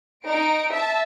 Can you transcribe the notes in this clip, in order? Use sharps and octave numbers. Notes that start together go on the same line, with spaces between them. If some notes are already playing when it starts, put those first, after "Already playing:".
D#4 D7
E5 A5